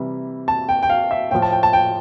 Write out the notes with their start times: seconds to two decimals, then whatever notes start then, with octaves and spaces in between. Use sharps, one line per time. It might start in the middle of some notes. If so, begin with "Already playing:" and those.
Already playing: C3 E3 G3
0.48 A5
0.69 G5
0.83 G5
0.90 F5
1.11 E5
1.31 A2 F3 G5
1.42 A5
1.53 G5
1.63 A5
1.73 G5